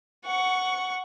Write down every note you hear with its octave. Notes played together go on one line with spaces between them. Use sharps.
F#5 C#6